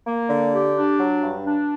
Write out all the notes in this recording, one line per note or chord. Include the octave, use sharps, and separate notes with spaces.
A#3
D3
G4
D4
F#3
G2
D4